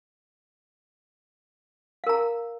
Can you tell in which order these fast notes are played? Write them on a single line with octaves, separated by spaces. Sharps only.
F5 A#4 A#5